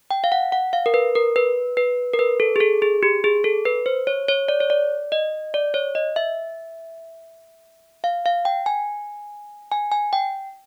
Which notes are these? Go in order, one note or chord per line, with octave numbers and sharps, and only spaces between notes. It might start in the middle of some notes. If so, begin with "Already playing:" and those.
G5
F5
F#5
F#5
F5
A#4
B4
A#4
B4
B4
A#4
B4
A4
G#4
A4
G#4
G4
G#4
A4
B4
C5
C#5
C#5
D5
C#5
D5
D#5
D5
C#5
D#5
E5
F5
F5
G5
G#5
G#5
G#5
G5